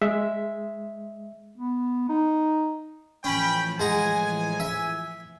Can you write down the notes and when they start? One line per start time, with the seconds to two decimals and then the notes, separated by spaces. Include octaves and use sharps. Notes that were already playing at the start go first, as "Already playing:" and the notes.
0.02 G#3 E5
1.58 B3
2.09 D#4
3.24 A2 E3 F3 C#4 G5 B5
3.80 G#3 F#5 G#5 A#5
4.60 E5